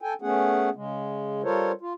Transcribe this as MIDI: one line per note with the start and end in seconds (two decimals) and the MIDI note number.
0.01 0.14 69
0.01 0.14 79
0.01 0.14 80
0.22 0.70 57
0.22 0.70 59
0.22 0.70 61
0.22 0.70 68
0.22 0.70 78
0.75 1.42 49
0.75 1.42 56
1.43 1.72 55
1.43 1.72 65
1.43 1.72 69
1.43 1.72 70
1.43 1.72 72
1.43 1.72 73
1.81 1.93 65